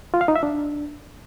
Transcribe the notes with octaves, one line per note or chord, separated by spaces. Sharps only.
F4
F5
D#4
E5
D4